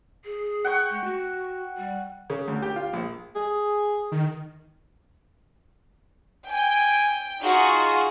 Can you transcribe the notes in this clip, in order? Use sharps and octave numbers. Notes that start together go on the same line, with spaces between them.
G#4
F#5 G5 C#6
G#3
F#4
G3
C#3
D2
G4
F4
A#1
G#4
D#3
G5 G#5
D#4 F4 F#4 G#4